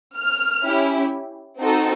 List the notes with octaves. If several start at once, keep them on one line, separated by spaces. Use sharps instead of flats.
F6
C#4 E4 G4
C4 D#4 F#4 A4